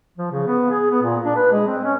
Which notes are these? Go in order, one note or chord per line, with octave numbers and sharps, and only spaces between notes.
F3
C#3
B3
G#4
B3
A#2
D4
B4
G#3
C4
C#4